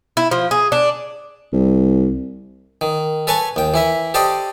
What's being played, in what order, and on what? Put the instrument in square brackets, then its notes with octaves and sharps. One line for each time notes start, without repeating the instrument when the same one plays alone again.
[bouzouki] E4
F3
G#4
D4
[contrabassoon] C2
[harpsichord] D#3
A4 B4 C#5 G#5 A5
D#2 G5
E3 E4 E5
G4 A4 C5 D5 D#5 G5